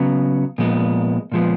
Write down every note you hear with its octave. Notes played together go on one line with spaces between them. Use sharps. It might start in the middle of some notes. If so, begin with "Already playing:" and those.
Already playing: C#3 F#3 B3
A#2 F3 G#3 B3
A#2 F3 G#3 B3